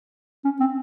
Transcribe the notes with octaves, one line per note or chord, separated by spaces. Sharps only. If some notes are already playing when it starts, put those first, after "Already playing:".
C#4
C4